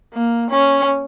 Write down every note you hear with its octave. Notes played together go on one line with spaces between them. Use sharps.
A#3
C#4